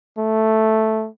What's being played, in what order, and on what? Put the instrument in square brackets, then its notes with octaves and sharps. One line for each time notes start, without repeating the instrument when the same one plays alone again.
[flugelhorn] A3